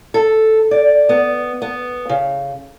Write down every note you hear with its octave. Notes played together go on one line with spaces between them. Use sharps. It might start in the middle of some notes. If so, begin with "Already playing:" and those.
A4
D5
B3
B3
C#3